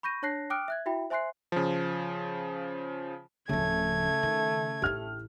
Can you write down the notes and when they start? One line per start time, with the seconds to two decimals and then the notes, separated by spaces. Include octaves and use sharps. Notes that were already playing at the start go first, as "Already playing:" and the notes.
0.03 B5 C#6 G6 A#6 D#7
0.22 D4 C#5 A5 F#6 A#6 C7
0.50 G5 D6 D#6 F6 F#6 D7
0.68 E5 F#6 G#6
0.86 E4 F#4 E5 G5 B5
1.10 C5 E5 G#5 C6 F#6 C7
1.52 C#3 F3
3.49 D1 C#3 F3 A3 G#6
4.23 D#3
4.82 A1 E4 G4 F6